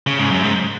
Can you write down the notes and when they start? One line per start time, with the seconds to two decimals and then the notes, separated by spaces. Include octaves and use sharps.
0.07 C#3
0.19 G#2
0.31 F#2
0.43 G#2